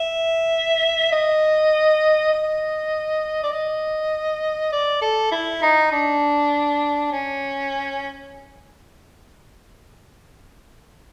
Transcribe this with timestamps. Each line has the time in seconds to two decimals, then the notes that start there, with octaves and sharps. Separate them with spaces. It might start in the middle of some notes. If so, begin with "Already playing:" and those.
Already playing: E5
1.12 D#5
2.33 D#5
3.44 D5
3.53 D#5
4.72 D5
5.02 A4
5.32 E4
5.62 D#4
5.92 D4
7.12 C#4